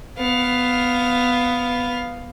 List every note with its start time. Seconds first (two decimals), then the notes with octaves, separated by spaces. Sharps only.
0.18 B3 F5